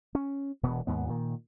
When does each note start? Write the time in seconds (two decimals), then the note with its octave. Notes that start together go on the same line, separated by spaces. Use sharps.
0.15 C#4
0.63 E1 B2 E3 B3
0.87 D#2 G#2 B3
1.08 A#2 D#3